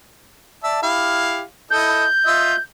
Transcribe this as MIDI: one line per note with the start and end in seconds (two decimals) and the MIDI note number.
0.64 0.81 74
0.64 0.81 76
0.64 0.81 81
0.83 1.42 64
0.83 1.42 67
0.83 1.42 77
1.71 2.05 64
1.71 2.05 69
1.71 2.05 75
1.71 2.57 91
2.26 2.54 65
2.26 2.54 75
2.26 2.54 76